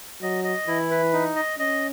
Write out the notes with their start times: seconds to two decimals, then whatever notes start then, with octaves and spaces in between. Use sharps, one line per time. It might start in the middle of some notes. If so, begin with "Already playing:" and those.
0.22 F#3 D#5
0.44 D#5
0.68 E3 E4
0.90 B4
1.13 D#4
1.36 D#5
1.59 C#4 D#5